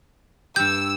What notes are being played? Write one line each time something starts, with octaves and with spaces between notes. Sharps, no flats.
G2 G4 E6 G6